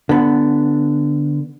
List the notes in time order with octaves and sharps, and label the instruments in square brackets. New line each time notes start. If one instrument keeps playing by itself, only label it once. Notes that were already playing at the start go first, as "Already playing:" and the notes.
[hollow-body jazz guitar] D3 B3